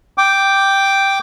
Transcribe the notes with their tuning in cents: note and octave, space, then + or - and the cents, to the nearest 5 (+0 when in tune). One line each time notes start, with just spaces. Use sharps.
G5 +0 D6 +0